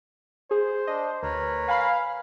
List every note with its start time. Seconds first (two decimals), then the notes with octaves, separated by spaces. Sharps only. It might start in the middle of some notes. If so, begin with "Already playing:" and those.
0.51 G#4 C5
0.87 D4 D#5
1.23 D2 A#4 B4 C#5
1.68 F5 G#5 B5 C7